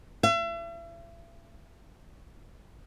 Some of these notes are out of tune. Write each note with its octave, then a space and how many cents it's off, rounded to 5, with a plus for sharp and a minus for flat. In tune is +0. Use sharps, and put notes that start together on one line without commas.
E5 +40